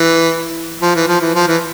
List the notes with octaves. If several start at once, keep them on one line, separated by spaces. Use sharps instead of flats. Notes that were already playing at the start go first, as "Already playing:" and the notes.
Already playing: E3
F3
E3
F3
E3
F3
E3